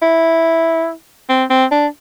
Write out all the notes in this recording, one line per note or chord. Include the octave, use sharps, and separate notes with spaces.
E4
C4
C4
D4